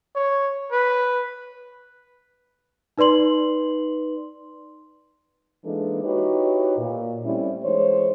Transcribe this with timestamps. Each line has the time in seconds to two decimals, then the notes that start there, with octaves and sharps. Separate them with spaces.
0.16 C#5
0.72 B4
2.98 D#4 B4 D5 C6 F#7
5.65 E3 G#3 A#3 D4 D#4 A4
6.04 D#4 E4 F#4 G4 B4 C#5
6.77 A#2
7.25 G3 A3 C4 C#4 E4
7.64 E3 G#3 D#4 C5 C#5